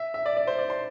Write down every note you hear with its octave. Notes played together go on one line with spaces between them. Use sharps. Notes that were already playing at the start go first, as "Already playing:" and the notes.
Already playing: E5
E5
D5
D5
C5
D5
C6